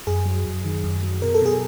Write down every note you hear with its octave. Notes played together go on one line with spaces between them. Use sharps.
F#2 G#4
F#3
F#2
D#3
F#2
F#3
B2 A#4
A4
B2 G#4